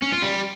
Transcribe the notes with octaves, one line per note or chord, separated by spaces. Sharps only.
C#4
F4
G3